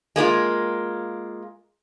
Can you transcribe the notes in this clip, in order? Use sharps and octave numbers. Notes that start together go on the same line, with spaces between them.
G#3 A#3 D4 F4